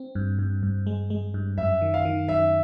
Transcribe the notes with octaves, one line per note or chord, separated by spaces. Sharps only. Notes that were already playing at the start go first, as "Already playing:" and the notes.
Already playing: C4
G2
G2
G2
G#3
G#3
G2
F#2 E5
D#3
F5
D#3
F#2 E5